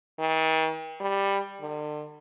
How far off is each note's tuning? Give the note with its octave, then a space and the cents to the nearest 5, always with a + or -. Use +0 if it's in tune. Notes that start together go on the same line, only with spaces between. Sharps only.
D#3 +45
G3 +10
D3 +40